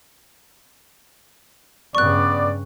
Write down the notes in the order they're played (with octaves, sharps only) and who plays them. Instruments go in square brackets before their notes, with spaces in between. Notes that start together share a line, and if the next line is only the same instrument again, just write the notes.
[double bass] G2 C#3 [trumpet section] B3 D5 [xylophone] C#6 F#6